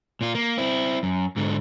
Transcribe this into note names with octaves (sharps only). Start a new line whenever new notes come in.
A#2 F4
A#3
C4 E4
F#2
G#2 D3